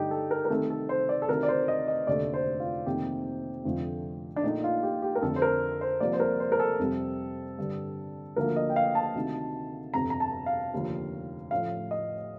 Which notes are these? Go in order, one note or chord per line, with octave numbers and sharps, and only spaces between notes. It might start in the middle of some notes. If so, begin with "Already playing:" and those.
Already playing: G2 D3 A3 D#4 G4
A4
A#4
A#4
C2 C3 D#3 A3 A4
A4
C5
D5
A4
D2 C3 D#3 A#4
D5
C5
D#5
D#5
F1 D#2 D3 A3 D5
C5
F4
F2 C3 D#3 A#3 G4
F1 F2 D3 F3 A3
D4
A#1 A#2 A3 D#4
F4
G4
G4
A#4
F2 D3 A3 A4
C5
A#4
C5
C2 C3 F3 A#3 D5
C5
A#4
C5
A#4
A4
F2 C3 G3
G2 D3 G3
D2 D3 F3 A#3 A#4
D#5
G5
F5
A5
D2 C3 D#3
G1 F2 C3 A#5
A#5
A5
F5
F1 D#2 D3 F3
A1 A2 F3 F5
D#5